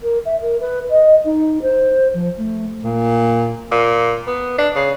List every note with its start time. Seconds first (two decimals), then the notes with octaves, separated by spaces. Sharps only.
0.03 A#4
0.26 E5
0.41 A#4
0.60 B4
0.90 D#5
1.25 D#4
1.62 C5
2.14 F3
2.38 A3
2.83 A#2
3.71 A#2
4.27 B3
4.59 D4
4.76 C#3